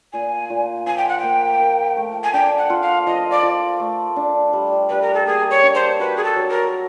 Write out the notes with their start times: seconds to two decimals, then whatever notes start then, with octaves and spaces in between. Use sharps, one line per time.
0.13 A#2 G#5
0.50 A#2
0.87 F3 G#5
0.98 G5
1.09 F#5
1.19 A#3 G5
1.60 A#4
1.97 A3
2.24 G#5
2.33 D4 G5
2.58 F#5
2.70 F4
2.82 F5
3.06 F3 D#5
3.31 D5
3.43 F3
3.79 A3
4.16 D4
4.53 G3
4.89 G3 B4
5.02 A#4
5.14 A4
5.26 A#3 G#4
5.50 C#5
5.63 D4
5.75 C5
5.99 F#4 B4
6.17 G#4
6.24 A4
6.36 F#3
6.49 A#4